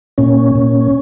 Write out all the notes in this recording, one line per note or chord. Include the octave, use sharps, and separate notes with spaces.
A#2 C#4
A#2